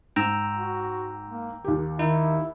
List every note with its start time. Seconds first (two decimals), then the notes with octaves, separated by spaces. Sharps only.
0.16 G#2 G5 A#5 E6
0.57 F#4
1.29 A#3
1.64 D#2 D#3 G4
1.99 D#3 D#4 E4